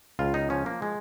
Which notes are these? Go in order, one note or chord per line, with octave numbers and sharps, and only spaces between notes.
C#2 F4
D#4
F3 C#4
A#3
G#3